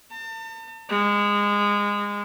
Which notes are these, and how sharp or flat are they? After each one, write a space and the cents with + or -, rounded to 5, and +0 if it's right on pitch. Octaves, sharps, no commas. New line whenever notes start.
A5 +40
G#3 -20